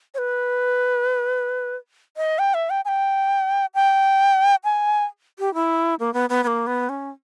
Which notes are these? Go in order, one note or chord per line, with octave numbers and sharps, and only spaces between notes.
C#5
B4
D#5
G5
E5
G5
G#5
G5
G5
G#5
G4
E4
A#3
B3
B3
B3
A#3
B3
C#4